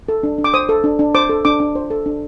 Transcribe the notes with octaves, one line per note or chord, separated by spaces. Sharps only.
A4
D4
D4
D6
C5 D#6
A4
D4
D4
C5 D6
A4
D4 D6
D4
C5
A4
D4